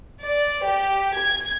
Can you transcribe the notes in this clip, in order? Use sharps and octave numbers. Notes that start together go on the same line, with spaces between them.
D5
G4
G#6